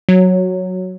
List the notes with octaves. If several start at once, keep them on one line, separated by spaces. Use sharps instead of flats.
F#3